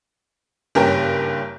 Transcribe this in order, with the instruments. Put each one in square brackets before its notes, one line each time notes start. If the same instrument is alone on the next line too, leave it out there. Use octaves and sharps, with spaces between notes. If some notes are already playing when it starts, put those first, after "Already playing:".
[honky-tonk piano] F#1 G2 C#4 G4 A#4